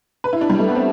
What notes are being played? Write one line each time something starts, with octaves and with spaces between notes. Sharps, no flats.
B4
E4
D4
G3
A3
B3
C4